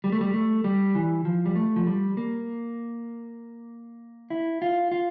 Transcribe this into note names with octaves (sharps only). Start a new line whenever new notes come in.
G3
A3
G3
A3
G3
E3
F3
G3
A3
F3
G3
A#3
E4
F4
F4